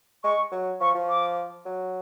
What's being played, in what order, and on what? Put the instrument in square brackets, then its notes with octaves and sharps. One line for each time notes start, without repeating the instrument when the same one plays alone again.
[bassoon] G#3 [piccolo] C#6
[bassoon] F#3
[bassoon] F3 [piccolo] C#6
[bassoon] F3
[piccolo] D6
[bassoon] F#3